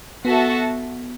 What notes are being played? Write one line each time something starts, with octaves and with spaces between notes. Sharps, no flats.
B3 F#4 A4 E5 A5